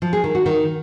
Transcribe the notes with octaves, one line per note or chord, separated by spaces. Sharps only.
F3
G#4
D#3
F#4
D#3